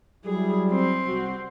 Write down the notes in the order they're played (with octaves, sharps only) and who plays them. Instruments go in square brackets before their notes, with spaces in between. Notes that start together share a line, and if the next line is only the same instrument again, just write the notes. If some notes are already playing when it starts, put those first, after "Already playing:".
[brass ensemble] F#3 G3 E4 [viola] G#4
[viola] C4
[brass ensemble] C2 F#4